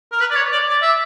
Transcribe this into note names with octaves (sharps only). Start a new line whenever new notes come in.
A#4
B4
D5
C#5
D5
D5
E5